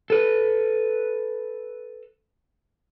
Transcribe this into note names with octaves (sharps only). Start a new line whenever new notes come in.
A4 B4